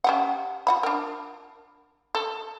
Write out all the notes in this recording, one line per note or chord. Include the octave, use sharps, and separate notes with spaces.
C#4 G4 F#5
F4 F#5 B5
D4 A#4
A4